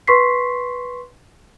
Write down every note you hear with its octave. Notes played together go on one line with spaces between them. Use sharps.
B4 C6 C#6 B6 C7